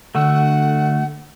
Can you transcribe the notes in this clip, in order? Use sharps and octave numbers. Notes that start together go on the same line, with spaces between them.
D3 A3 F#4 F#5 E6